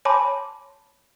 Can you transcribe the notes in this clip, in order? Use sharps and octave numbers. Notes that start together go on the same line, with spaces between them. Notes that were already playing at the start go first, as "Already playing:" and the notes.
C#5 G#5 A5 B5 C6 D6